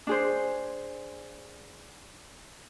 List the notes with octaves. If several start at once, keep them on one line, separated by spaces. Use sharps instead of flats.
D4 G#4 C5